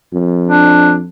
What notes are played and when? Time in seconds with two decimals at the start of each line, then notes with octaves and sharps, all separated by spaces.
0.13 F2
0.48 D4